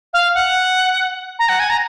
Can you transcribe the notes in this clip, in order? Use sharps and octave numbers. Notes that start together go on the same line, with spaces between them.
F5
F#5
A#5
F#5
G#5
A#5